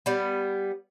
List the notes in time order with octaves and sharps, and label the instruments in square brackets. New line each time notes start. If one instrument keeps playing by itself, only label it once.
[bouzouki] G3 B3